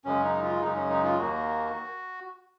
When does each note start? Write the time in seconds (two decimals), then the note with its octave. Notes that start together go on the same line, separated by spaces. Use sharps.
0.05 F#2 C#3 G#3 C#4
0.24 D#4
0.43 F4
0.61 F#2 C#3 G#3 D#4
0.76 C#4
0.89 D#4
1.04 F4
1.18 D#2 D#3 A#3 F#4